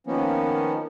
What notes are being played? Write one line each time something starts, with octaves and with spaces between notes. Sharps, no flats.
D#3 F3 A#3 B3 C#4